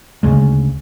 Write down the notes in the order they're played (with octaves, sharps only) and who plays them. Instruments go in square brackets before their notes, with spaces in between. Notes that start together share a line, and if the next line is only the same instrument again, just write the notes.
[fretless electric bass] D2 C#3 G#3